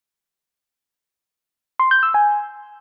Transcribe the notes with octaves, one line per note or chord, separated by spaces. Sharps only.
C6
G6
E6
G#5